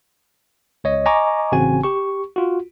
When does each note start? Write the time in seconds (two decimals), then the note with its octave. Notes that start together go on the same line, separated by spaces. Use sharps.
0.84 C#2 C#5 D#5
1.06 D#5 G#5 A#5 C#6 D6
1.52 A1 C#3 C4 F#4 G#5
1.84 G4 C#6
2.36 F4 F#4